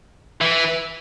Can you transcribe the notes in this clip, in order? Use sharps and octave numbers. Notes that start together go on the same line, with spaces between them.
E3